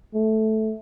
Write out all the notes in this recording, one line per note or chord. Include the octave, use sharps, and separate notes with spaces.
A3